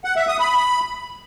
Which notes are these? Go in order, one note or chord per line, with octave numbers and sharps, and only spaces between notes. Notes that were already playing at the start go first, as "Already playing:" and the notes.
F#5
E5
D#6
B5